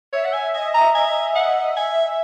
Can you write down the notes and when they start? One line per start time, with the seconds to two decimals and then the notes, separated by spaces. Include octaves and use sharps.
0.13 C#5 E5
0.25 F#5
0.33 G#5
0.54 D#5 G#5
0.74 A#5
0.95 G#5
1.36 F#5
1.76 E5 G#5